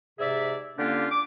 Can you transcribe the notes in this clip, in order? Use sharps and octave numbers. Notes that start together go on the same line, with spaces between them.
G#2 C3 G#4 D5 E5
D3 A#3 C#4 D4 F4 G4
D6